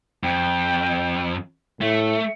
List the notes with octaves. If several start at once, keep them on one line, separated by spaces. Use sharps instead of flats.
F2 G5
A2 A3 E5